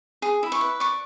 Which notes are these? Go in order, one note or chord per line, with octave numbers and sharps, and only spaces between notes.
G#4
E4
C#6
B4
D5 C#6